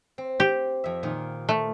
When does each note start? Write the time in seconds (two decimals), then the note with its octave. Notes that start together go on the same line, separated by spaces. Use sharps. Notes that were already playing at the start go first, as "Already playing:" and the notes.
0.18 C4
0.40 G4
0.84 F2 E5
1.03 A#2 D#3 F4
1.49 A3